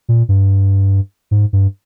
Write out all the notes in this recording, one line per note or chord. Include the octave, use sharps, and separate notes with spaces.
A#2
G2
G#2
G2